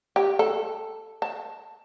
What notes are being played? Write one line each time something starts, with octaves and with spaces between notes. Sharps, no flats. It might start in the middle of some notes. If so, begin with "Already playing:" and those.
G4
A4
A5